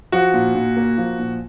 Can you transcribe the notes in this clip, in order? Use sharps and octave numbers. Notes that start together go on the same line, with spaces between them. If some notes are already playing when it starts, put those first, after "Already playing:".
F3 F#4
A#2
A#2
A#3
F3
A#2